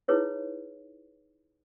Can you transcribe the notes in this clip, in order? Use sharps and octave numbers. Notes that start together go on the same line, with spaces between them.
D#4 E4 G#4 B4 C#5 D#5